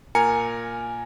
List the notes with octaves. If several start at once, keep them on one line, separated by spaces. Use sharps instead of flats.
A#2 A#4 G#5 A#5 C#7